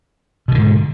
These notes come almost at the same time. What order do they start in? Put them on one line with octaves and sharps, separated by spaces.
B2 D#3 D3 G#2